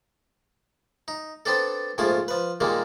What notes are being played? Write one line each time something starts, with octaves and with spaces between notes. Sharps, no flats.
D#4
B3 C4 D4 A4
A#1 G#2 F3 A3 F4 G#5
F3 B4
A#2 D#3 G3 G#3 A#3